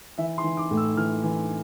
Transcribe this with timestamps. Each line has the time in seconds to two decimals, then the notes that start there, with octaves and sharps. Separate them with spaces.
0.18 E3 E5
0.38 C6
0.44 E3
0.57 D6
0.71 A2
0.77 E6
0.97 E3 F6
1.24 E3